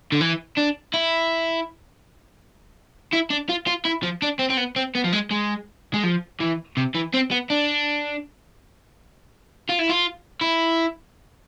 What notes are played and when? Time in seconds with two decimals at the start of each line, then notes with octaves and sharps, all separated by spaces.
0.12 D3
0.21 E3
0.57 D4
0.94 E4
3.13 E4
3.30 D4
3.49 F4
3.67 F4
3.85 E4
4.03 F3
4.22 D4
4.39 C4
4.50 C4
4.57 B3
4.76 C4
4.95 B3
5.04 F3
5.13 G#3
5.31 G#3
5.94 G#3
6.04 F3
6.40 E3
6.77 C3
6.95 E3
7.14 C4
7.31 B3
7.50 D4
9.69 F4
9.79 E4
9.89 F4
10.41 E4